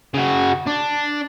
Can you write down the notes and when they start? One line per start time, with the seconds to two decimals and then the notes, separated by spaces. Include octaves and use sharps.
0.14 C#3 F#4
0.67 D4